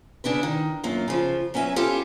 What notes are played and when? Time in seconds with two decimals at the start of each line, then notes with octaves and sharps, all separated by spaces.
0.24 C#3 D4 E4 B4
0.43 D#3
0.84 F#2 A#3 F4
1.08 C#3 F3
1.54 F#3 C#4 B4 E5 G#5
1.76 C#4 E4 F4 G4 A4